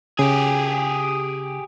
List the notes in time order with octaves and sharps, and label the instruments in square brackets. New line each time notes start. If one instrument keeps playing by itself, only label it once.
[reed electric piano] C#3 [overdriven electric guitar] G4 G#4